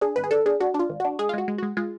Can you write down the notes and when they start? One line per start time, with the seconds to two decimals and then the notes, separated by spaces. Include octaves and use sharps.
0.01 D4 G#4
0.16 G#1 B4
0.24 G#4
0.31 D4 A4
0.46 D4 G#4
0.60 D4 F#4
0.74 D4
0.79 F4
0.89 G#1
1.00 D4 F#4
1.19 G#3 G#4
1.29 F4
1.34 G#3 F#4
1.48 G#3
1.58 G#3 F#4
1.77 G#3 F4